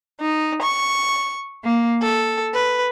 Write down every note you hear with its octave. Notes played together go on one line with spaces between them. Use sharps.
D#4
C#6
A#3
A4
B4